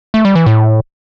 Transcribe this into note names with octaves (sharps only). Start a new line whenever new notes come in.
A3
G3
E3
A2